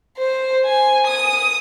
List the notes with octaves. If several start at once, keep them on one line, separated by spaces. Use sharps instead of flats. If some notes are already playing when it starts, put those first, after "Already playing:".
C5
G#5
D#6